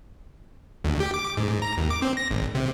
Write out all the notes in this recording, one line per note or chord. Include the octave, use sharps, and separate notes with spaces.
D2
G4
D6
G#2
A#5
D#2
D6
C4
A#6
G#1
C3